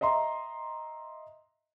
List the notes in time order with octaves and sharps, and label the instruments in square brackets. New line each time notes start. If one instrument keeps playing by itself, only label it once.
[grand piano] D#5 E5 A#5 C6